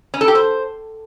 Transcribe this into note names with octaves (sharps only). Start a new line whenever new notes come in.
C#4
A4
G4
C5